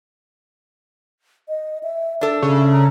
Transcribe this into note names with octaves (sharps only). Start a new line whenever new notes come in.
D#5
E5
D4 A4 E5
C#3
A#5